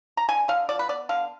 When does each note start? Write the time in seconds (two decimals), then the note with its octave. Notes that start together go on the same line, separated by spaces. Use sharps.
0.17 A#5
0.29 D3 G#5
0.48 D3 F5
0.69 F3 D5
0.79 B4
0.89 B3 D5
1.09 D3 F5